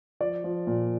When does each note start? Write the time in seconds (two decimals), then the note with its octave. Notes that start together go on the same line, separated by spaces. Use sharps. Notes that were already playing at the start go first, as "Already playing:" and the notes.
0.20 F3 D5
0.44 F3
0.67 A#2